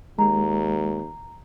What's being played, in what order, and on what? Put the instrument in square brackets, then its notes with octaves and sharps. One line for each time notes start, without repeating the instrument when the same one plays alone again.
[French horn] D#2 [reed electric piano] G#3 [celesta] A#5